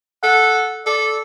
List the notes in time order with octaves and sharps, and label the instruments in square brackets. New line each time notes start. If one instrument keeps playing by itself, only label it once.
[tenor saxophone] A4 [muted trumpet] F#5
[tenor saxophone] A4 [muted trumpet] D5